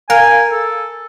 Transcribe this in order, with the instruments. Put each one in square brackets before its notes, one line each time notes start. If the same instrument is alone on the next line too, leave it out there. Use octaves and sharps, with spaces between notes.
[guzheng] A#4 [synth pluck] F5 [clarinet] G#5
[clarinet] A4